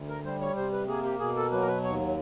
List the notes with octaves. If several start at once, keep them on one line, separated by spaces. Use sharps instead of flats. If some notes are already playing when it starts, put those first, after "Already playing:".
Already playing: D2
A#4
G3 C5
C#5
C3 C5
B4
A#3 G#4
G4
B2 G#4
A4
F#3 B4
A#4
B4
D#2 C#5